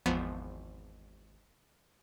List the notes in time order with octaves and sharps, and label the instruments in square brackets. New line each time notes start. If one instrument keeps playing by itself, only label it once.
[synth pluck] G#1 E2 F3 B3